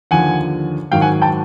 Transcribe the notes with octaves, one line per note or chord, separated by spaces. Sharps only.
D#2 D3 F3 F#5 G#5
G#1 G#2 D#3 F#3 F5 G5
F#5 G#5
G5 A5